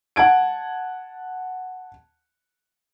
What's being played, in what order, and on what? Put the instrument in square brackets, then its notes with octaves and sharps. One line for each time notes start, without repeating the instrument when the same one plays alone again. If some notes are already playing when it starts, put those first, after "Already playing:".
[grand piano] F#5 A5 G#6 D7